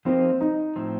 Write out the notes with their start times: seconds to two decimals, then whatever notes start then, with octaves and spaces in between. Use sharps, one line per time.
0.05 F3 A#3 C4 D#4 G4 C5
0.41 D#4
0.76 A2 F3 C4